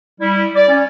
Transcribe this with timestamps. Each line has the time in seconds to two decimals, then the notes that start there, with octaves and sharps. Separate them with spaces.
0.21 G3 E4
0.55 D5
0.69 C#4